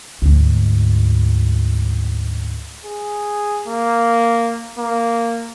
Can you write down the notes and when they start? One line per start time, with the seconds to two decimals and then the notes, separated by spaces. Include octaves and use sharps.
0.22 D2 G#2
2.85 G#4
3.68 A#3
4.79 A#3